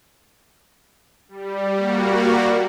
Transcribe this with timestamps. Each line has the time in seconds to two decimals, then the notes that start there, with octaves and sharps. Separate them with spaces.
1.28 G3
1.74 G3 A#3 F#4